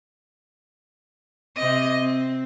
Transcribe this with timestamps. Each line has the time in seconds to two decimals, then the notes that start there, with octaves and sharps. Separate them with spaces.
1.56 C3 C4 D#5
2.01 C4